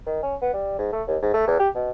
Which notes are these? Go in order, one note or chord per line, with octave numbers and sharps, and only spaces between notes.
D#3
C#4
B3
G3
G#2
A3
D#2
G#2
A3
E2
G4
B2